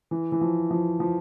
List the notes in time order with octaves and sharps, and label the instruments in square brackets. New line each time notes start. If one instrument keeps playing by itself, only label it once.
[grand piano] E3
E3
F3
F3
F3